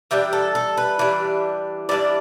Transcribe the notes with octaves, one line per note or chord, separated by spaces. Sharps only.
E3 G3 D4 G5
A4
A4
B4
E3 G3 D4
E3 G3 D4 D5